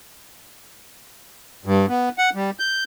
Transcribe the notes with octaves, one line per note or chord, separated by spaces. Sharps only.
G2
B3
F#5
G3
G6